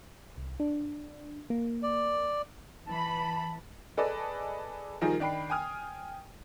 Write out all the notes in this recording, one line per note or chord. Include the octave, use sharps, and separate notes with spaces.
C2
D4
A#3
D5
E3 A5 B5
G#4 A4 B4 D5 D#5 A5
D#3 F3 G3 D#4 G#4 A#4
D#3 D4 G5 B5 C7
G5 G#5 D#6 F6